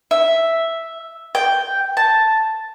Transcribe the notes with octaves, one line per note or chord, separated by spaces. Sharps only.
E5
G5
A5